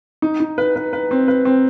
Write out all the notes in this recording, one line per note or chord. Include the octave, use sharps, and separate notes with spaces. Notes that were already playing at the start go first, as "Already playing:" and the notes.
D#4
D#4
B4
B4
B4
C4
B4
C4